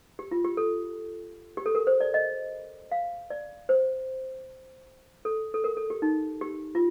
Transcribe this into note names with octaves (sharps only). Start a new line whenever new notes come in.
G4
F4
G4
A4
G4
A4
A#4
C5
D5
D#5
F5
D5
C5
A4
A4
A#4
A4
G4
D#4
G4
F4